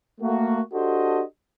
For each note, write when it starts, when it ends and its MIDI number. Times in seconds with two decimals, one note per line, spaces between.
0.21 0.61 57
0.21 0.61 58
0.21 0.61 66
0.73 1.22 62
0.73 1.22 66
0.73 1.22 67
0.73 1.22 69
0.73 1.22 72
0.73 1.22 75